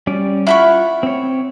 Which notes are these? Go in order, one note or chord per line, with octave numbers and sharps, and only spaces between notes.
G3 C#4 D5
E4 F4 F5 F#5 B5 C#6
C4 C#5